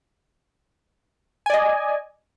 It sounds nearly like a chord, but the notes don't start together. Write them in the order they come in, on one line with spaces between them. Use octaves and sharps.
G#5 D5 D#5